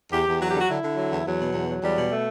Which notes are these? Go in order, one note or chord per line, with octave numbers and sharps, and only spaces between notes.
E2 G4
E2
F#3 F#4
G4
D3
F#4
D3 E4
D3
F#3
E2
E2 F#3
B2
E2
F#3
E2 G3
B2
A3